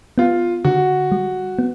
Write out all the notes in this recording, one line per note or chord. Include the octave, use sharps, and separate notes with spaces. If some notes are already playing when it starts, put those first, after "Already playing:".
B3 F4
D3 F#4
G3
B3